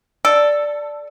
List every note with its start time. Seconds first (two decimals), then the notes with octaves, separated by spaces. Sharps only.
0.25 A4 D5